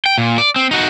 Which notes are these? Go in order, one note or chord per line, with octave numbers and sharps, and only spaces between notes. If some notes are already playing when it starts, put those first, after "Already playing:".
G5
A#2
D5
C4
D#4 F#4